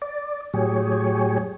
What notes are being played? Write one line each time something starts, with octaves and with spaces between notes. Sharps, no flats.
D5
A2 F#3 G4 G#4 C#5